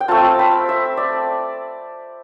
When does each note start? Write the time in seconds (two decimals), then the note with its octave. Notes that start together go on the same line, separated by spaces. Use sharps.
0.01 G5
0.08 A3 C4 F4 A5
0.39 B5
0.69 E5
0.97 D5